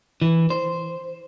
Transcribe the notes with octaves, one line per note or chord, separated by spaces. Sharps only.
E3
C5